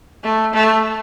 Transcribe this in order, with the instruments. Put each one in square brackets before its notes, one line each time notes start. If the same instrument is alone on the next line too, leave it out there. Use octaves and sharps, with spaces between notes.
[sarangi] A3
A3